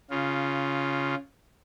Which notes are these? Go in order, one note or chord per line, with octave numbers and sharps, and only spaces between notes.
C#3 F4